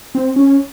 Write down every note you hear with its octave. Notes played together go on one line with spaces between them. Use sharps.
C4
C#4